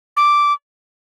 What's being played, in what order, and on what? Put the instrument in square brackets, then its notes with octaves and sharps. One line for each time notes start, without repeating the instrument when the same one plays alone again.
[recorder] D6